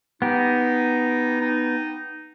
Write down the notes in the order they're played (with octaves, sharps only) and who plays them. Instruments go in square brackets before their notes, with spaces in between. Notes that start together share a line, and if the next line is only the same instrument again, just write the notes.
[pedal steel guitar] B3 G4 [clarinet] D#4
[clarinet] D#4